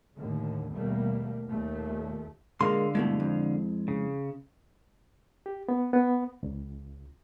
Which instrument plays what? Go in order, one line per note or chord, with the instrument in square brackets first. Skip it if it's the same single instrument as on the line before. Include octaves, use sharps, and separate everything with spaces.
[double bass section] D#2 A2 D3
D#2 B2 G3 A3 A#3
D#2 A#2 A3
[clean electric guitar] A#2 A#3 C6 [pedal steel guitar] D3 F5 [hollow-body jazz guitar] G#3
[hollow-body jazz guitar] G2 B2 A3 [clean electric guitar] G#3 E4
[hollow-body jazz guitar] F2
[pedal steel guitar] C#3
[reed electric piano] G4
B3
B3
C#2